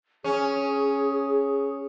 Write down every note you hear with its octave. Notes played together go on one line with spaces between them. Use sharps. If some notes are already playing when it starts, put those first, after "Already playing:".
C#4 G#4